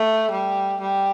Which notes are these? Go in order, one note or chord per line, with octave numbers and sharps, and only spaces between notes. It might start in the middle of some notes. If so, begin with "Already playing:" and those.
Already playing: A3
G3
G3